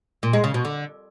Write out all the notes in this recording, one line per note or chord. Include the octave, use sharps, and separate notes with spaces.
A#2
G#3
C#3
B2
D3